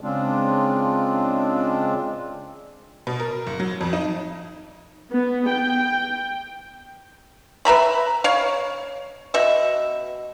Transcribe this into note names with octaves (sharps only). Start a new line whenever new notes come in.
C#3 G#3 C4 D4 F4
B2
A#4
F#1
F#3
F2
D#4
B3
G5
B4 E5 A#5 B5
C#5 F5
B2 E5